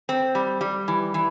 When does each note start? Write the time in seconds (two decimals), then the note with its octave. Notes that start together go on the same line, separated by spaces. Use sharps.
0.09 C4
0.35 G3
0.61 G3
0.88 E3
1.14 E3